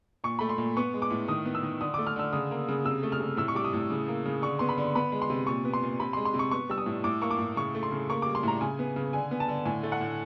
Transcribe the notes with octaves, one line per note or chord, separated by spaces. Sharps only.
A#2 C#6
A3 B5
C6
A#2
B3 C#6
G#3
D6
A2
D#3 D#6
B3
E6
D#3
D3 D#6
A3 D6
F6
D3 E6
C#3 D#6
A#3
C#3
C3 E6
A3
F6
C3
A2 E6
C#6
G3 D6
D#6
A2
C#3
A#3
C#3
D3 C#6
B3 C6
B5
D3
B3 B5
G#3
C6
C3
A#2 C#6
B3
C6
A#2
C3 B5
C6
G#3
C6
C3
C#6
B3 C#6
G3 E6
D#6
A2
A2 D6
A#3 C#6
D6
A2
C#3 C#6
A3
C6
C#3
A#3 C#6
G3 D6
C6
A2 A#5
C#3 G#5
B3
C#3
D3 G#5
B3
A5
D3
A2 G#5
A3
F#5
A2